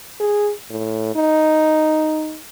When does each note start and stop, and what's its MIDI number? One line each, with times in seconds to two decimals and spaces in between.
0.20 0.52 68
0.70 1.11 45
1.15 2.38 63